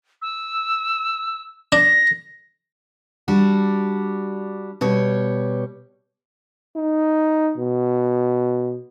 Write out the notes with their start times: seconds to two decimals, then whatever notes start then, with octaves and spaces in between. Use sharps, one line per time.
0.22 E6
1.72 D4 A#6
3.28 G3 D4 F#4
4.81 B2 G3 C#5
6.76 D#4
7.58 B2